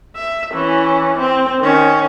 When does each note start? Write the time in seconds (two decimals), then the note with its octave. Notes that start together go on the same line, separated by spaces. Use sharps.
0.16 E5
0.54 E3 C#4
1.19 C4
1.60 D#3 C#4